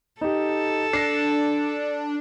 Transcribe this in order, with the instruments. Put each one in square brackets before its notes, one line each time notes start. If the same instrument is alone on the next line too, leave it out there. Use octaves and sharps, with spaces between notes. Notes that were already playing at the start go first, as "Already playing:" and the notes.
[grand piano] D#4 G4 [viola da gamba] A4
[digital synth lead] D4 [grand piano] A#6 C7